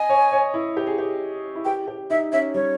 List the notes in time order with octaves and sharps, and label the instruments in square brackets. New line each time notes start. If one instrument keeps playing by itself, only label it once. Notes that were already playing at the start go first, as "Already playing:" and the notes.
Already playing: [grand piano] D#5 [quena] G#5
[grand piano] C#5
C#5
E4
G4
G#4
G4
E4
[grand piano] G4 [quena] G5
[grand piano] G4
[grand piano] D#4 [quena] E5
[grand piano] C#4 [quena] E5
[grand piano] G3 [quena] C#5